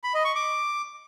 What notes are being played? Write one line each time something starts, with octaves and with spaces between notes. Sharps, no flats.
B5
D#5
C#6
D6